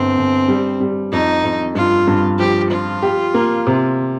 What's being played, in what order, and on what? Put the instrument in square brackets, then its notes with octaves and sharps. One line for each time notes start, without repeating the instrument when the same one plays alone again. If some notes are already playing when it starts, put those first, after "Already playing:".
Already playing: [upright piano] G1 [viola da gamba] C4
[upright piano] G1
G3
G3
[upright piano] F2 [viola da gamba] D#4
[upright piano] F2
[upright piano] G2 [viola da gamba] F4
[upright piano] G2
[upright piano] F3 [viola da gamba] G4
[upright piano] F3 [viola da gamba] F4
[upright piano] G4
A#3
C3